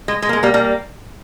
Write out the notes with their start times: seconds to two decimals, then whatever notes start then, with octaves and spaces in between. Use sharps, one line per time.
0.08 G#3
0.22 G#3
0.29 A#3
0.33 G#3
0.43 G3 A#3
0.54 G3 A#3